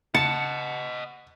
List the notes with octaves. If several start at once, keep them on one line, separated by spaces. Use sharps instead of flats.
C#3 D#5 F#5 A5 C#7